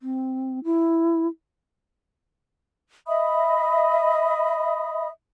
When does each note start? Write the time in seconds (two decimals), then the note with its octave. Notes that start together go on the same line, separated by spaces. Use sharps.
0.01 C4
0.64 E4
3.07 D#5 E5 B5 D#6